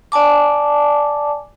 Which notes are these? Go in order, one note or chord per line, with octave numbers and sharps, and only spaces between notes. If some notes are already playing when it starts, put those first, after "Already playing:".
D5 G#5 A5 D6